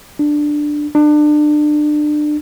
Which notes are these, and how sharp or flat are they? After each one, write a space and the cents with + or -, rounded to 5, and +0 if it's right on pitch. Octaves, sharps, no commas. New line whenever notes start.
D4 +10
D4 +30